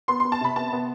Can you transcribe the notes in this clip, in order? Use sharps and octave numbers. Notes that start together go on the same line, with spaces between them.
B3 C6
B3 C6
A5
C3 B5
B3 A5
B3